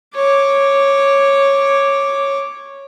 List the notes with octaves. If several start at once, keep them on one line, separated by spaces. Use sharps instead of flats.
C#5 D6